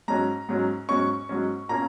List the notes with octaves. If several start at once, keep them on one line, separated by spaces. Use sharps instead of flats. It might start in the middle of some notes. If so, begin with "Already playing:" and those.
G#2 F#3 C#4 A#5
G#2 F#3 C#4
G#2 F#3 C#4 C#6
G#2 F#3 C#4
A#2 A#3 C#4 A#5